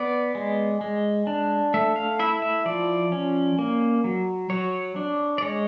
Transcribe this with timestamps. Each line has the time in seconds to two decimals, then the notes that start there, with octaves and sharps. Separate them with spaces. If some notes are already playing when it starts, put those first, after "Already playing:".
Already playing: B3 D5
0.35 G#3
0.81 G#3
1.27 D4
1.74 A3 E5
1.96 F5
2.19 E4 E5
2.42 E5
2.65 F3 D5
3.12 C#4
3.59 A#3
4.04 F#3
4.50 F#3 C#5
4.96 D4
5.38 D5
5.42 G#3 C#5